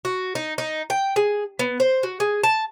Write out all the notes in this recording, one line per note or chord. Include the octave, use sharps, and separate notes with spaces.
F#4
D#4
D#4
G5
G#4
B3
C5
F#4
G#4
A5